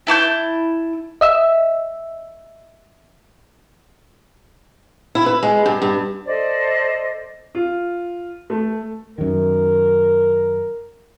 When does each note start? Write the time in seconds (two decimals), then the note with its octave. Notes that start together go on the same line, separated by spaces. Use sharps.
0.07 E4 A5 D6 G6
1.21 D#5 E5 E6
5.15 E4
5.26 B4
5.43 G#3
5.66 G2
5.82 G2
6.26 A4 C5 D5 D#5
7.55 F4
8.50 A3
9.18 F#2 D#3 A#4